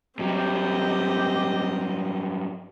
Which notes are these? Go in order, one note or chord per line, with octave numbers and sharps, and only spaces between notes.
G2 F#3 C4 G4 D#5